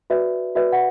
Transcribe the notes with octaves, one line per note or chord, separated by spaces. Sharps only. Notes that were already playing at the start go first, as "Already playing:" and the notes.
F#4 B4 D5 E5
F#4 B4 D5 E5
F#5